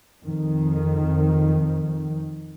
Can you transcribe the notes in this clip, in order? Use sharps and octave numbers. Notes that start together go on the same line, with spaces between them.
F2 D#3